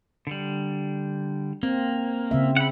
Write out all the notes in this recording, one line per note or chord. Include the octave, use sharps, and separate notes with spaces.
D3 G3
A#3 C4
C#3 C4 E5
F#5 B5